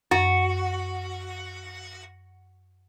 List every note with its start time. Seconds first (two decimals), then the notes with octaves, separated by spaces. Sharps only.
0.11 F#2 F#4